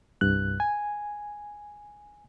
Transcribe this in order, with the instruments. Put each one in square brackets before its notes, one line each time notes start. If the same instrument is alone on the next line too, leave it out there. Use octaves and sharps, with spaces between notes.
[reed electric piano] C2 G2 F#6
G#5